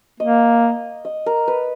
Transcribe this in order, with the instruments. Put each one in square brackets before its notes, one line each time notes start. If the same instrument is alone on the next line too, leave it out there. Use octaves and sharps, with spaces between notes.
[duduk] A#3 [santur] D#5
[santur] D#5
A#4
B4